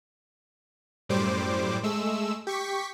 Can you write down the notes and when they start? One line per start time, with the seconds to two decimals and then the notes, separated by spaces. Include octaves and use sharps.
1.09 F#2 A2 G3 C5 D6
1.83 G#3 A3 E6
2.47 G4 C#6 B6